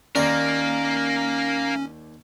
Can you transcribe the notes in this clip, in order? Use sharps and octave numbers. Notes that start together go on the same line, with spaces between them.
D#2 A#3 C#4 A#4 D5